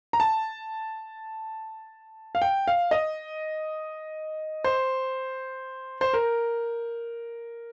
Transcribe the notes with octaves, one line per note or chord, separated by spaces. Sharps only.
A#5
A5
F5
G5
F5
D#5
C5
C5
A#4